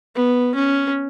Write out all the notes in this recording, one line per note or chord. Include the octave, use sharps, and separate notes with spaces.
B3
C#4